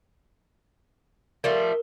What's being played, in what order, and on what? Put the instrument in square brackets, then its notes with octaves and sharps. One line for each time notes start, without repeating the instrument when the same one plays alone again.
[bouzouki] F3 G3 A3 [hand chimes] A#4